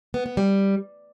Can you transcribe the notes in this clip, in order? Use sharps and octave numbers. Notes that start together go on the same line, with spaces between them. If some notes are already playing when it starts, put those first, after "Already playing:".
B3
B3
G3